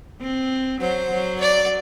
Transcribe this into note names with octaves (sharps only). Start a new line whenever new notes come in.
C4
F#3 C5
F#3
D5